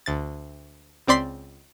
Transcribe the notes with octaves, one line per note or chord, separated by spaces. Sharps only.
D2 A6
C#2 C4 D5 C6 B6 C7